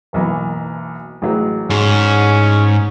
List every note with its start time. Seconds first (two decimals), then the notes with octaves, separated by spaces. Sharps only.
0.13 F#1 B1 E3
1.22 A1 F#3 G#3
1.70 G#2 C#4